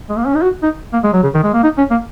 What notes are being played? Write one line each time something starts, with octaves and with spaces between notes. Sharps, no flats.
G#3
A#3
C#4
D#4
F#4
D#4
A#3
G#3
F#3
C#3
D#3
G#3
A#3
D#4
C#4
A#3